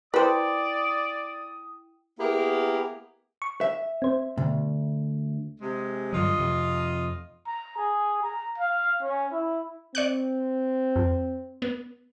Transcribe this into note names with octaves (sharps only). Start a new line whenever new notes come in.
E4 B4 C5 D5 G5 D#6
A#3 B3 E4 G4 G#4 A#4
C#6
E5
C4 C5
D2 B2
C3 G#3
G2 D3 F#3 F4 D#5
F2 C3
A#5
G#4
A#5
F5
C#4
E4
C4 D5 C#6 F#6
F2
B3